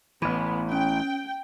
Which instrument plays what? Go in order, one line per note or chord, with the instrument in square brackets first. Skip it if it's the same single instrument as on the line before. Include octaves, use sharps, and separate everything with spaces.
[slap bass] A1 E3 [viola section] B3 [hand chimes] B5
[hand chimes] C#4 [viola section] G5